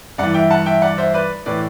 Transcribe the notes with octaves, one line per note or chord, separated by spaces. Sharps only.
G2 E3 D5 F#5
E5 G5
F#5 A5
E5 G5
D5 F#5
C5 E5
B4 D5
A2 E3 B4 D5